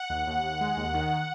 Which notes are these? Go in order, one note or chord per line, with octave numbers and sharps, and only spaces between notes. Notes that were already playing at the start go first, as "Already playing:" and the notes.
Already playing: F#5
D#2
D#2
D#2
G#3
D#2
D#3